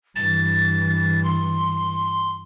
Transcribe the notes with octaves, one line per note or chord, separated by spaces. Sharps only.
G2 E3 A6
C6